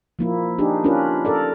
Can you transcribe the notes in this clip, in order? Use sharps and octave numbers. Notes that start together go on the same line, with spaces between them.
F3 A#3 E4
D4 D#4 G4 G#4
C#4 D4 F4 A#4 B4
A4 A#4 D5